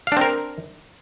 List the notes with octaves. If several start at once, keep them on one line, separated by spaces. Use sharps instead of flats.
C4 D4 A#4 F5